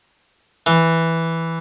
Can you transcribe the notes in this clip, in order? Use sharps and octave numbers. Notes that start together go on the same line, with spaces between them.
E3